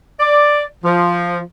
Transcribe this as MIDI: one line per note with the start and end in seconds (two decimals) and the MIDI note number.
0.20 0.63 74
0.84 1.39 53